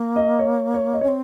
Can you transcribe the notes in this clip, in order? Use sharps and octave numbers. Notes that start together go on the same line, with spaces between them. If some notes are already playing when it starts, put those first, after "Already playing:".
Already playing: A#3
D#5
C#5
C#5
D#5
C#4 C#5
C4